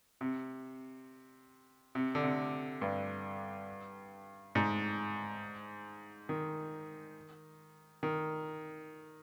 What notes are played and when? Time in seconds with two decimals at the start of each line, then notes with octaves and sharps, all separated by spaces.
0.21 C3
1.95 C3
2.15 D3
2.23 C3
2.82 G2
4.55 G#2
6.29 D#3
8.03 D#3